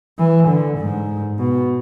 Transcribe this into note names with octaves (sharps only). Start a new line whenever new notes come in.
E3
D3
G#2
B2